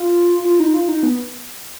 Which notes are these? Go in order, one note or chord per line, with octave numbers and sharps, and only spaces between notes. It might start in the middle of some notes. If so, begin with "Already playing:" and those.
Already playing: F4
F4
D#4
F4
D#4
B3